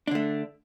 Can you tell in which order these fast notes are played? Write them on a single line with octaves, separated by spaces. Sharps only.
D4 D3 A3